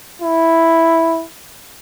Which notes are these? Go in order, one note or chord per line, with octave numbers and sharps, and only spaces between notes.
E4